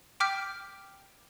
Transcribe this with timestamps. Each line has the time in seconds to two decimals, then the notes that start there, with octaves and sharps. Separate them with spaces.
0.20 G5 D6 F6 G6 B6 D7